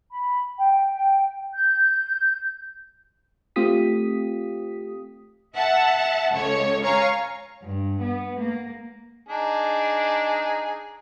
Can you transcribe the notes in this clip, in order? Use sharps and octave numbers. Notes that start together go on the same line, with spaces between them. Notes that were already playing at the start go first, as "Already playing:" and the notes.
B5
G5
G6
A3 C4 F4 G4 D#6 B6
E5 F#5 A5
C#2 A4 C#5
C#5 F5 G#5 A#5 C#6
G2
B3
A#3
D4 D#4 G#4